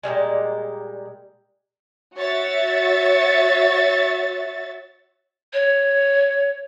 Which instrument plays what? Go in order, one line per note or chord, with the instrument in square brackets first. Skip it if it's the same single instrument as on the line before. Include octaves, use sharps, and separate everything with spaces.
[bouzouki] A#2 F3 G3 G#3
[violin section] F#4 C#5 E5 A6
[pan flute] C#5